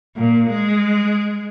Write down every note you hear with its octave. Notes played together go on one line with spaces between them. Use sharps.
A#2
G#3